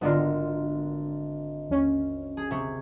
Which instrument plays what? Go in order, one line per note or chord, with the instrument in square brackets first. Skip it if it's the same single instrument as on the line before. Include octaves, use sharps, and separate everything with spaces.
[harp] G#1 D3 A#4 [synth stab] B3 D4 F4
[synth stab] D#2 C#4
[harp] G#4
C3 G#4 C#6